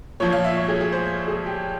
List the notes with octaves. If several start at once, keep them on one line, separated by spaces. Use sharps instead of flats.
A#2 F3 C#5
F5
E5
C#5
G#4
G#4
C5
G#4
G4